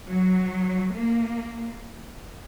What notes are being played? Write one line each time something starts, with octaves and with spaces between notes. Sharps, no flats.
F#3
A#3